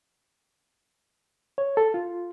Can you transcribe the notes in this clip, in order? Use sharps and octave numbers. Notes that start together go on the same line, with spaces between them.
C#5
A4
F4